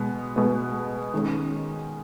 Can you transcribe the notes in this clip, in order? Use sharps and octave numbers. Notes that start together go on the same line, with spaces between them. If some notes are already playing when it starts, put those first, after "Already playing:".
Already playing: B2 G#3 B3
B2 G#3 B3
D#3 G#3 C#4